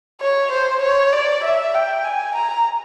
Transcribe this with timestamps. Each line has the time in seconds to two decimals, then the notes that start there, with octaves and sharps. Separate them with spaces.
0.21 C#5
0.52 C5
0.82 C#5
1.13 D5
1.44 E5
1.74 G5
2.04 G#5
2.35 A#5